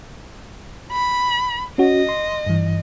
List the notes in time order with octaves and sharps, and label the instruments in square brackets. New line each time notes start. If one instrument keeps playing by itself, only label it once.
[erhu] B5
[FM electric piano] C#4 F#4 [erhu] D#5
[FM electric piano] C6
G2 E3